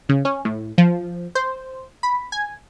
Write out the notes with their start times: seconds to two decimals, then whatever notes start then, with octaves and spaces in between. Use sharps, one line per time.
0.09 C#3
0.25 C#4
0.45 A2
0.78 F3
1.35 C5
2.03 B5
2.32 G#5